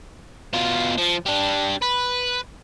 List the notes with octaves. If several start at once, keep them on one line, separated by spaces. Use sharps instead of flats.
B2 F4
F3
G3 D4
B4